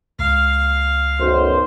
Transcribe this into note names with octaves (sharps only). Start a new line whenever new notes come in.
C#2 F5
B1 F#2 C5